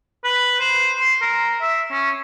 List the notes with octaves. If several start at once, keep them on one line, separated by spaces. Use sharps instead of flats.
B4
C5
C6
A#4
E5
C#4